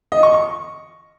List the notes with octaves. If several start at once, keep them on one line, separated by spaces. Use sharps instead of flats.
D#5
C#6
C#6